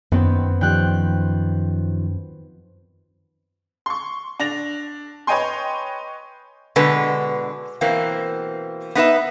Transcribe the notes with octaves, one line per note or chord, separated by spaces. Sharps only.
F#2 D#3 B3 C4
D#3 F3 G3 G5 F#6
C6 C#6
D4 A#6 F7
B4 C#5 D#5 G5 G#5 C6
B2 D3 G#3 B4
B2 E3 A#3 C4
B3 D#4 B4 E5